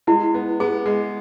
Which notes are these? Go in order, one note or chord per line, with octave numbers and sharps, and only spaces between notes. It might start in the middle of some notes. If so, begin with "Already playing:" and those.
G#3 E4
B3
B3 G#4
G#3